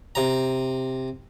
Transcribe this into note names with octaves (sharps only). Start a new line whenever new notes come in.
C3 A#5